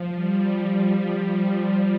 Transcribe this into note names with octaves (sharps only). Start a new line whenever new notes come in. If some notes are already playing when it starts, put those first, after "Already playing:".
Already playing: F3
F3 G3